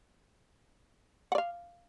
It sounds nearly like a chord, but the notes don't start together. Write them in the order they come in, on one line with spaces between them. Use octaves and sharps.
F#5 D5 F5